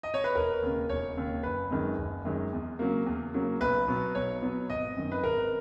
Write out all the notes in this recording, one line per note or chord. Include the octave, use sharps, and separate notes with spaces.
D#5
C#5
B4
E1 A#4
D#2 C#3
E1 C#5
D#2 C#3
F#1 B4
F#2 D#3 G#3
F#1
F#2 D#3 G#3
E2
C#3 F#3 A#3
E2
C#3 F#3 A#3
B1 B4
B2 F#3 B3
B1 C#5
B2 F#3 B3
G#1 D#5
F#2 D#3
B4
G#1 A#4